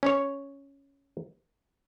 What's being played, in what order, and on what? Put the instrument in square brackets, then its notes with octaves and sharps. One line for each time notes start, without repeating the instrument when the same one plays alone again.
[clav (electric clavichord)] C#4 C#5